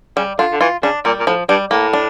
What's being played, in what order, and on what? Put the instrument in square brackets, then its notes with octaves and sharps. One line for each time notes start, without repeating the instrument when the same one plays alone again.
[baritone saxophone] C#3 [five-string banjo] G3
[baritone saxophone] D3 [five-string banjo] F4
[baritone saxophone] D3
[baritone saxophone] E3 [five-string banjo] F4
[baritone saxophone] C#3 [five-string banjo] D4
[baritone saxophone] A#2 [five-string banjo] G3
[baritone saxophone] A#2
[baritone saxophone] A2 [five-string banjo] F3
[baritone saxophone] G2 [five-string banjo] G3
[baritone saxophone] A2 [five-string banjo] A#3
[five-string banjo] D4